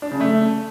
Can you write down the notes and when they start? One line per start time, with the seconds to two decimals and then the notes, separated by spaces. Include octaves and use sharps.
0.02 D4
0.11 C#3
0.20 A3